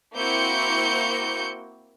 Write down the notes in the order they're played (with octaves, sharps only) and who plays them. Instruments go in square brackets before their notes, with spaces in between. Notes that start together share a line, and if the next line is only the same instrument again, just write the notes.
[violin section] A#3 C4 E4 F#4 G6 C#7